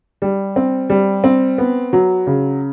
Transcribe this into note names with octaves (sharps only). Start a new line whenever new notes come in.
G3
C4
G3
C4
B3
F#3
C#3